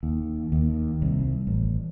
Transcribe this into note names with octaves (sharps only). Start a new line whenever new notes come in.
D#2
D#2
C2
A1